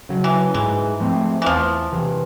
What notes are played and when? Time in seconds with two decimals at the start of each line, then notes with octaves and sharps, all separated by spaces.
0.09 C#3 F#3
0.24 E3
0.54 G#2 E3
1.00 F3 A3 C4
1.42 E3
1.46 E2 F3
1.92 C3 E3